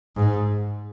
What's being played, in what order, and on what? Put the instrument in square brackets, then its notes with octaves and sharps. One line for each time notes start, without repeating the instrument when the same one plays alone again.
[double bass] G#2